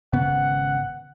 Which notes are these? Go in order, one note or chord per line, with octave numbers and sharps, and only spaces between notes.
G#1 C#3 B3 F#5